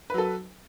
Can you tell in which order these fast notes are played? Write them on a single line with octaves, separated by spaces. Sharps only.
B4 F#3 A4